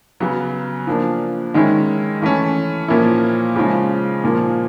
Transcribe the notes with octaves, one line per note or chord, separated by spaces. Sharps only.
C#3 F#3 B3
F3 A#3 D4
D#3 G#3 C#4 E4
E3 A3 C#4
A#2 F3 A#3 C#4 E4
C#3 F3 G#3 C#4
A#2 F3 A#3